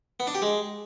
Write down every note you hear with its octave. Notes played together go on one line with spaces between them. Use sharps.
B3
D4
G4
G#3